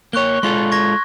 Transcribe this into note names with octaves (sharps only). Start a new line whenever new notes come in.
A#3 C#5 C#6 F#6 G7
G#3 F4 A4 C6
C#6 G#6 A#6